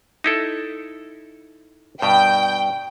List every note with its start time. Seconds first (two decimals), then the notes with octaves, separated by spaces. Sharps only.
0.24 D#4 E4 A4
2.02 G2 B2 G5